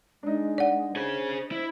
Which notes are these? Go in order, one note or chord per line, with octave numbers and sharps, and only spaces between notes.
G#3 D4 D#4
D5 F#5
G#4 C5 C#5
E4